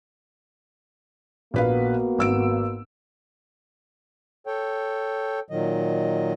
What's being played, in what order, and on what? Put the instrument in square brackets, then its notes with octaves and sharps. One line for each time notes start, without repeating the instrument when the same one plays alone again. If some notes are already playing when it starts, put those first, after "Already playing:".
[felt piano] A#1 B4 F5 [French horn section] A#3 B3 F#4
[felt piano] G#1 E6 D7
[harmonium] A4 C#5 G5
A#2 D#3 F#3 D#5